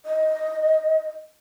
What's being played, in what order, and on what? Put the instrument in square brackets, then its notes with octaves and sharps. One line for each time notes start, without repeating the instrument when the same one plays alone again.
[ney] D#5